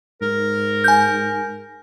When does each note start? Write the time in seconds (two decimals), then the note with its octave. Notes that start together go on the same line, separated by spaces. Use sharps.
0.22 G#2 A#4
0.84 G#5 G6